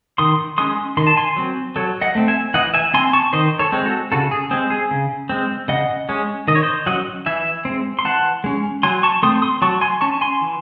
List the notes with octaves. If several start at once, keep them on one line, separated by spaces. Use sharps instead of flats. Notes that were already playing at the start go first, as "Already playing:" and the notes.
D#3 C6 D#6
G#3 C#4 C6 D#6
D#3 C6
A5
G#5 C6
F#3 C4
F#3 A4 C#5
D#5 F#5
A3 C4
E5 G#5
E3 D#5 F#5
E5 G#5
C4 G#5 C6
A5 C#6
D#3 C5 D#5
A4 C#5
G#3 C4
F#4 A4
C#3 F#4 A4
G#4
G#3 C4 G#4
G#4
C#3
G#3 C4
C#3 D#5 F#5
G#3 C#4
D#3 D#5
C#5
C5 D#5
F#3 C#4 D#5 F#5
E3 E5 G#5
G#3 C4
C6
E3 F#5 A5
G#3 C#4
F#3 G#5 C6
A5 C#6
A3 C4 C6 D#6
C6 D#6
F#3 A5 C#6
G#5 C6
C#4 A5 C#6
G#5 C6
E3